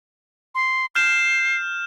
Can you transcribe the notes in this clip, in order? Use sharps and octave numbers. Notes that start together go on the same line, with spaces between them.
C6
F6 G6 C7 E7